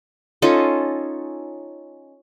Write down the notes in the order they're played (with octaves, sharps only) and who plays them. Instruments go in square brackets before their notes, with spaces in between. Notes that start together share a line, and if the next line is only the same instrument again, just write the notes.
[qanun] C#4 D#4 F4 A4